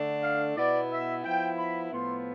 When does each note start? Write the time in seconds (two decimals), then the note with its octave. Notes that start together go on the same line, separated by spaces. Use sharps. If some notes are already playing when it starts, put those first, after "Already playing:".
Already playing: D3 A3 D4
0.22 F5
0.56 B2 B3 E4 D5
0.90 E5
1.24 F3 B3 E4 G5
1.58 B5
1.92 A2 F3 B3 E4 C6